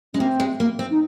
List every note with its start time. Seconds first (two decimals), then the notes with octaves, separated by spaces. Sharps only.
0.14 G#3 C#4
0.20 A#3 C4
0.40 G#3
0.60 A#3
0.79 C4
0.91 D#4